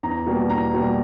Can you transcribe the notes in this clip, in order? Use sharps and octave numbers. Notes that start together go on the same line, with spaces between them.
E2 A#5
B2 G3 A#3
E2 A#5
B2 G3 A#3